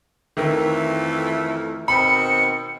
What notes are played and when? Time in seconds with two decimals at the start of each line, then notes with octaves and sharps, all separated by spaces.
0.37 F2 D#3 E3 A3
1.88 B2 D#3 C4 B5 C#7